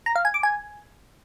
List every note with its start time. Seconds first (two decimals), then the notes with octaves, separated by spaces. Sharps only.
0.06 A#5
0.15 F5
0.25 G#5
0.34 D6
0.43 G#5